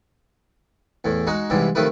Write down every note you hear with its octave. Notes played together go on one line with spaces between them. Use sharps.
E2 A2
G#3 D#4 F#4
G#2 C3 E3 G3
C3 D#3 F3 A3 E4 B4